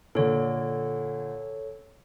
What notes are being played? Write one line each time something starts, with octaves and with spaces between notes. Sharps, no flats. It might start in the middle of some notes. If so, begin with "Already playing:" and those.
A#2 D3 A4 C#5